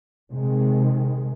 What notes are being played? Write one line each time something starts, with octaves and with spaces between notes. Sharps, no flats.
C3 D#3 G#3